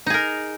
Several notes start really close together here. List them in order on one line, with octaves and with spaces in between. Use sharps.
D#4 G#4 A#4